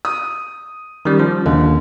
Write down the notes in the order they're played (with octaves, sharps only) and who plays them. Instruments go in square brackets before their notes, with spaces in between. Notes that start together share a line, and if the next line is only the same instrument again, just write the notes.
[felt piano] D#6
[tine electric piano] D#3 G3 [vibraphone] C#4
[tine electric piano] F3
[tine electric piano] D#2 [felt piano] D3